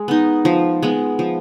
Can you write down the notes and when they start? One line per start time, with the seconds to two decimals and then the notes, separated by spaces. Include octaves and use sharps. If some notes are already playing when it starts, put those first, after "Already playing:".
Already playing: G#3
0.08 B3 D#4
0.45 F3
0.83 G#3 B3
1.19 F3